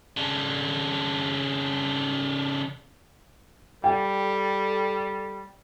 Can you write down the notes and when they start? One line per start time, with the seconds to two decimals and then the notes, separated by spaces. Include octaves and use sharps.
0.17 C#3 D4
3.84 G3 A4 G5